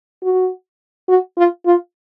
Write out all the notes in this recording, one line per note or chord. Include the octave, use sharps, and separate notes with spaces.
F#4
F#4
F4
F4